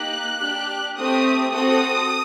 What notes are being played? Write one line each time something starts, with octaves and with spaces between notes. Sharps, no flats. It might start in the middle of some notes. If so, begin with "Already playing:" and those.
Already playing: A#3 D#4 G4 F#6
D4 G4
A3 C4 G4 D#6
C4 F#4 A4 D#6